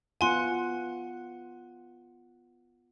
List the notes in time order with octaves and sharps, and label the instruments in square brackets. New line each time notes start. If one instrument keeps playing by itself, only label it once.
[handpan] B3 F4 F#5 [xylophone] G#5 C6